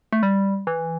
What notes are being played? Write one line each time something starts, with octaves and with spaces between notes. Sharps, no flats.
A3
G3
E3